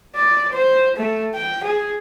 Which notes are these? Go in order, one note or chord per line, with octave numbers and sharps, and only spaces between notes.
D5
C5
A3
G5
G#4